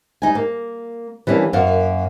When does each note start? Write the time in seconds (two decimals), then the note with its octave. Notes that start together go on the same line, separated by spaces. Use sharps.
0.22 G3 D#4 G#5
0.35 A#3
1.27 E3 G3 A#3 C#4 D4
1.53 F#2 A#3 F#4 F5